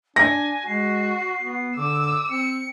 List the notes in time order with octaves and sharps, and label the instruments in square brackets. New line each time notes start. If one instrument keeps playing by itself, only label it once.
[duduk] D4 [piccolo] G#5 [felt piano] A#6
[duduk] G#3 [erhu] F#4 [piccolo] C7
[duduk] B3
[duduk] D3 [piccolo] D6 [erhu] E6
[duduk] C4 [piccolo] C#7